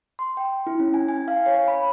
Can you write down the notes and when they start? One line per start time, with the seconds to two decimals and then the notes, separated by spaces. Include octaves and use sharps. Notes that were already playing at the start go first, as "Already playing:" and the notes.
0.19 C6
0.37 G5
0.67 E4
0.80 C#4
0.94 G#5
1.08 G#5
1.28 F5
1.46 C#5
1.68 B5